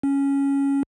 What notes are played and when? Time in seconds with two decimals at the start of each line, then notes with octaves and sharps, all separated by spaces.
0.03 C#4